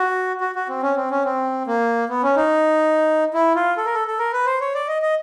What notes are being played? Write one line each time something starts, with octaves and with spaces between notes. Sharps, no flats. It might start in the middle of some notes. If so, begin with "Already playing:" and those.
Already playing: F#4
F#4
F#4
C4
C#4
C4
C#4
C4
A#3
B3
C#4
D#4
E4
F4
A4
A#4
A4
A4
A#4
B4
C5
C#5
D5
D#5
D#5